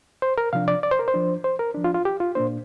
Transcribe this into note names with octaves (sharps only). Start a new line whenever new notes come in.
C5
A#4
C3 F3 D4 F5
D5
D5
C5
A#4
C5
F3 D4
C5
A#4
F3 D4
F4
F4
G4
F4
A#2 A#3 D4 C5